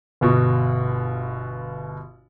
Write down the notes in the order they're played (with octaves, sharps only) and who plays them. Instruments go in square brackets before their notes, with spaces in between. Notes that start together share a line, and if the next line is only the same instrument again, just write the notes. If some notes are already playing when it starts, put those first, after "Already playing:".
[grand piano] G1 B2 F#4